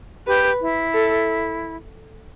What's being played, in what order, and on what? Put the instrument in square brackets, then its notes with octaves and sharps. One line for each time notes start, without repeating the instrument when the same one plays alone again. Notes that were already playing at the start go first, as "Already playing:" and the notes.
[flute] G4 [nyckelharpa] B4
[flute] E4
[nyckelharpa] A4